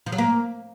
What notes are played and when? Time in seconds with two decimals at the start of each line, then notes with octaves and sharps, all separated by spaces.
0.06 F3
0.12 F#3
0.18 A#3